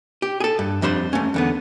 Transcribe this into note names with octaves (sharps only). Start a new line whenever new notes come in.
G4
G#4 A4
G2
F2 G3 D4 C5 C6
A3 C#4
E2 D3 B3